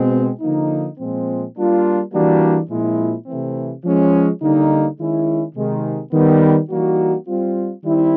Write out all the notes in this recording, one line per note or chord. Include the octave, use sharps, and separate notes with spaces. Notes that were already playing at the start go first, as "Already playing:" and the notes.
Already playing: B2 G#3 C4
D3 F3 A#3 D#4
A#2 F3 G#3 C4
G3 A#3 D4 F4
E3 G3 A#3 D4 F#4
A#2 F3 G#3 C4 E4
C3 E3 A3 C4
F3 G#3 C#4
D3 G3 A#3 D#4
D#3 G#3 C#4 E4
C3 D#3 G#3
D#3 G3 B3
E3 G3 A#3 D#4 F#4
G3 C4 F4
D#3 G3 C4 E4